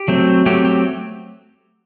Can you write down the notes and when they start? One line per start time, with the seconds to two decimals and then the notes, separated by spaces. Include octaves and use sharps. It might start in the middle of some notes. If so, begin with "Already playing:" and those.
Already playing: G4
0.08 F#3 A3 C4
0.46 F#3 A3 C4 G4
0.65 G4